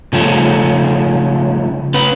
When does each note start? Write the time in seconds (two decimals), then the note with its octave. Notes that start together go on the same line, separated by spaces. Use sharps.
0.13 C#3 F3 A3 C#4
1.94 C#4 B4